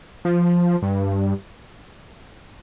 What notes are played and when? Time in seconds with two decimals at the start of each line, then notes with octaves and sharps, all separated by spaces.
0.25 F3
0.82 G2